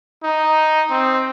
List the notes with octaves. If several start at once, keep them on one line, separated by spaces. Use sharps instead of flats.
D#4
C4